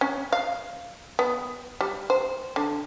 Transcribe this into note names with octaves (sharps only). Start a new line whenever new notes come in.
C#4
F5
B3
G3
C5
D3